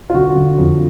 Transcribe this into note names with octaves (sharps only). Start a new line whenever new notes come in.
F4
D3 F#4
D3
F2